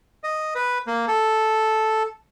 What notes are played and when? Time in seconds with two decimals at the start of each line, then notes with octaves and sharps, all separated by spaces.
0.24 D#5
0.55 B4
0.87 A#3
1.08 A4